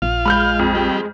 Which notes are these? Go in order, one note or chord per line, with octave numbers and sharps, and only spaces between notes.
A#1 F4 F5
G#3 B5 F6 G6
F2
G3 G4